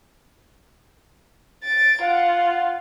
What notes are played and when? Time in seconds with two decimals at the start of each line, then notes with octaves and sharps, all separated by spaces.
1.64 A6 D7
2.02 F4 F#5